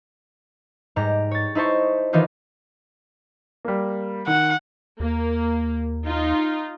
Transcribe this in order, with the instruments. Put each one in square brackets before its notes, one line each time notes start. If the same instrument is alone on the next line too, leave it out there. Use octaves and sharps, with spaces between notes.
[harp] G#2 G3 G4 A#5
C#5 A6
D#4 E4 C5 A5 C#6
D#3 E3 D#4 F4 G4
[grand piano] G3 A#3
[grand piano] D#3 [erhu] F#5
[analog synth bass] D#2 [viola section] A#3
[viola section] D#4 F4